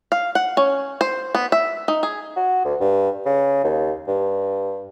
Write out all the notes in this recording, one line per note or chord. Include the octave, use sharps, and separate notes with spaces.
F5
F#5
C#4
C5
B3
E5
D#4
G#4
F#4
D2
G2
C#3
D#2
G2